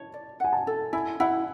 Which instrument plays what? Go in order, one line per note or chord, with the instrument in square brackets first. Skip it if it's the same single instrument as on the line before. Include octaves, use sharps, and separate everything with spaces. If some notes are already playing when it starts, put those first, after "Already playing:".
Already playing: [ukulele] C#5 [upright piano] A5
[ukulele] D5
[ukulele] F#5 [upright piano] G#5
[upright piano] A5
[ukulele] A4
[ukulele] E4 [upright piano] G#5
[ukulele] E4 [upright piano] F#5